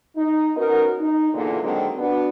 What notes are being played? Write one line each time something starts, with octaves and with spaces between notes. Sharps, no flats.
D#4
B3 C#4 D#4 F#4 A#4
D#4
E2 A#2 D3
D3 D#3 F#3 G#3 A#3 C4
B3 D4 F#4